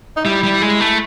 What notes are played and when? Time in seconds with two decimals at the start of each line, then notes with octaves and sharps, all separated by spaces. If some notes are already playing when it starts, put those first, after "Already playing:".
0.17 D#4
0.25 G3 E4
0.43 G3
0.62 G#3
0.80 A3